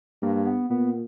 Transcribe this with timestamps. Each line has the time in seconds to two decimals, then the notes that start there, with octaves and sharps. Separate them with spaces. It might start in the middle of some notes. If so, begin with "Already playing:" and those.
0.22 G2 A#3
0.46 B3
0.70 A#2 B3